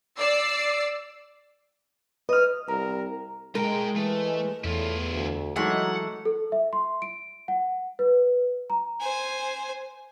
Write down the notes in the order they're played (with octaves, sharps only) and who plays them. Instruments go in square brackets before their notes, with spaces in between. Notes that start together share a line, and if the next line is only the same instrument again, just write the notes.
[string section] D5 D6 E6 C7
[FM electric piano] B4 [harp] D#5 F6
[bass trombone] C2 [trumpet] A#4 [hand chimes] A#5
[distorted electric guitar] A2 G5 [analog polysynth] G#3 [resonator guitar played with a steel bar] A#4
[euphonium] E3 [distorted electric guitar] A3
[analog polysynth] E2 [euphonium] A2 [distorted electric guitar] E4 F4
[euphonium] D2
[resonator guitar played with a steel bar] E3 G#3 A3 [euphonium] F#3 [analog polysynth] D#4 [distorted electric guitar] F#5
[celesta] A4
E5
C6
D7
F#5
B4
A#5
[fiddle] C5 G#5